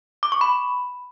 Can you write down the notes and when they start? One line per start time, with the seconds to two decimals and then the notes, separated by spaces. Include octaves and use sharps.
0.23 D6
0.32 C#6
0.41 B5